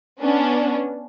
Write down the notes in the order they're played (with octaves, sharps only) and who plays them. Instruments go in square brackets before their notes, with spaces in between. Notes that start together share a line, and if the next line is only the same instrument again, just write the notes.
[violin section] B3 C#4 D4